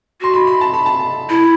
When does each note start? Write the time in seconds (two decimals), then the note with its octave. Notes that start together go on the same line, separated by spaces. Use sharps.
0.21 F#4 C6
0.34 B5
0.47 B5
0.61 A5
0.74 B5
0.86 A5
1.29 E4 B5
1.41 B5